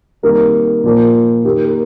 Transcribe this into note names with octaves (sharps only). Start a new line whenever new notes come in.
C3 D#3 G3 A#3 A#4
A#2 F3 A#3
D#3 A#3 G4
A#4